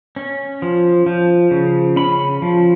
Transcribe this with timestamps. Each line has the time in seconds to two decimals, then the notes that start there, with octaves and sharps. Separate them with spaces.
0.16 C#4
0.62 F3
1.06 F3
1.51 C#3
1.96 C#4 B5
2.42 F3